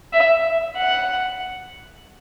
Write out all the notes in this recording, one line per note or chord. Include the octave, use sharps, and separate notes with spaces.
E5
F#5